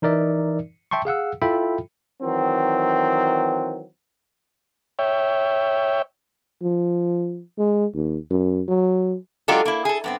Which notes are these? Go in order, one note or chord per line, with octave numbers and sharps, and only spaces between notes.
E3 D#4 A#4 D5 E5
E5 G5 A5 C6 C#6
G#4 F5 F#5 E6
E4 F4 A4 E5 G5 B5
D#3 E3 F#3 C4
C#5 E5 G5
F3
G#3
D#2
F#2
F#3
F#3 G#3 D4 F4 G4 A4
A#3 E4
G#4 A4
G2 B3 C4